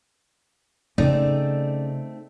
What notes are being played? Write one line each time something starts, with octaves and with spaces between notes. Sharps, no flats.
C#3 A3 C4 D#4 D5